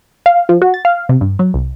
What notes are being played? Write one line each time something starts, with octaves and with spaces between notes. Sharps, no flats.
F5
F3
F#4
A6
F5
C3
G2
F#3
C2